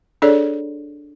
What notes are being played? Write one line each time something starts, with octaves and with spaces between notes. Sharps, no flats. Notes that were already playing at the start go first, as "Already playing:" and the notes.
D4 G#4 A4 C#5 D5